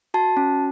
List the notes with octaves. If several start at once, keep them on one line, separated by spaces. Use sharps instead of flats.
F#4 A5
C#4